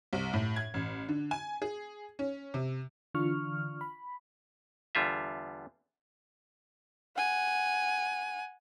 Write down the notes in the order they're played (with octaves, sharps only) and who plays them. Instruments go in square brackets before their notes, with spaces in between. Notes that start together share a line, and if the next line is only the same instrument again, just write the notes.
[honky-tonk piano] C2
A2
G#6
A1
D3
G#5
G#4
C#4
C3
[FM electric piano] D3 E3 D4 F4 C#6 F6
B5
[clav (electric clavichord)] E2 D3 G3 F4 E5
[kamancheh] F#5 G#5